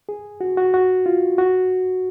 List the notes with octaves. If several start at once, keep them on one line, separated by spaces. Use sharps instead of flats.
G#4
F#4
F#4
F#4
F4
F#4